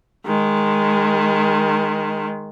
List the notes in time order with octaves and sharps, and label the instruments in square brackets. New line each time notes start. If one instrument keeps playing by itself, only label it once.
[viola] D#3 G#3